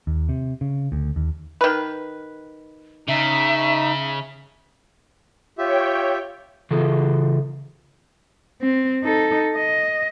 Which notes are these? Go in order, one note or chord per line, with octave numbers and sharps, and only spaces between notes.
D#2
C3
C#3
D2
D#2
D#3 B4
C#3 D#4 E5
F4 G4 C#5 E5 G5
C#3 E3 F4 G#4 A4
C4
D#4 A4
D#5